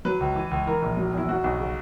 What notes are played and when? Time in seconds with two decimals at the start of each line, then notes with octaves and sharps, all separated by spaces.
0.05 F#3 B4
0.20 C#2
0.36 E3
0.51 C#2
0.67 E3 A#4
0.82 A#1
0.97 F#3
1.13 E2 E4
1.29 F#3 F#4
1.44 B1
1.59 C#3